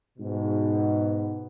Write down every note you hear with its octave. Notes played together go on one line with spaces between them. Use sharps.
G#2 B2